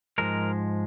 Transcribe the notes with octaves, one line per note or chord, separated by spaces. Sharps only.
G#2 F3 G#3 A#4